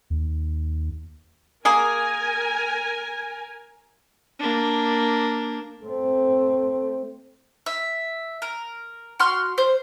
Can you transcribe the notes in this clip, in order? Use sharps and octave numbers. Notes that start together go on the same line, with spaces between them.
D#2
A#3 G#4 A#4 G#5
A#3 D4
A3 C4
E5
A#4
F#4 C6 F6
C5